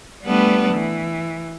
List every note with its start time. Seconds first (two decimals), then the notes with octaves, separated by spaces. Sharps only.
0.24 G3 A3 B3 D4 B4
0.73 E3